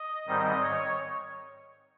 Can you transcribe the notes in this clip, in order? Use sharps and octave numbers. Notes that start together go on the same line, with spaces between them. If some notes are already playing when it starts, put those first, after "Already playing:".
Already playing: D#5
G#2 D#3 G3 C4
C#5